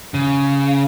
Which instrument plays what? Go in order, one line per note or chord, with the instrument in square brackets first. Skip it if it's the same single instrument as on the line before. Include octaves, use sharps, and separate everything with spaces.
[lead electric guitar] C#3